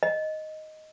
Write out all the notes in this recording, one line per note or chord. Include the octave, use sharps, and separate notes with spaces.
D#5